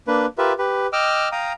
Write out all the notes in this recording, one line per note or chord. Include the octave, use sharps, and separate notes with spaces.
A#3 D4 B4
F4 G4 A#4 B4 E5
G4 B4
D#5 G5 D6 E6 F6
F5 G5 A#5 D#6